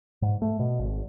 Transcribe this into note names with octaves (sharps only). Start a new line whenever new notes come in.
G#2
A3
B2
G#1